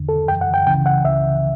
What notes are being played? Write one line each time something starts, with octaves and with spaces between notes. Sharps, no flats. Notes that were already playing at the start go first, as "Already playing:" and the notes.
Already playing: E2 D3
A4
F#2 E3 G5
F#5
G5
C#2 C#3 E3 G5
F#5
C#2 C#3 E3 E5